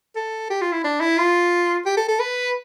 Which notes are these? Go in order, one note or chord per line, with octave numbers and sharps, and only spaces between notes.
A4
G4
F4
E4
D4
E4
F4
G4
A4
A4
B4